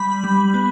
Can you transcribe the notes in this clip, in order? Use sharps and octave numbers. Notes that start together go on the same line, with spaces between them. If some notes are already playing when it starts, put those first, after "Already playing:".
Already playing: G3 B5
G3
B3